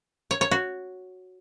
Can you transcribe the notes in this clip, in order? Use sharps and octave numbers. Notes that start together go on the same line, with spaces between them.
C#5
C#5
F#4